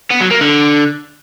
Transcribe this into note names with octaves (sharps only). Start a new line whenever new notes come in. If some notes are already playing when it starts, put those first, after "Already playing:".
B3
F#3
A#3
D3